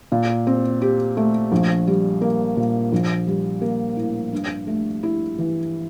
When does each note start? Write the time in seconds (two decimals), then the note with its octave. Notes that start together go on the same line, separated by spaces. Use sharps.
0.12 A#2
0.47 C4
0.82 G4
1.17 A3
1.52 A#1
1.87 G3
2.22 A#3
2.57 A#2
2.92 A#1
3.27 G3
3.62 A#3
3.97 A2
4.32 G2
4.67 A3
5.03 E4
5.38 E3